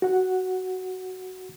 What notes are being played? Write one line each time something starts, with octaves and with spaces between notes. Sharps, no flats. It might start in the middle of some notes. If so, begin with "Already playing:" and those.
F#4 F#5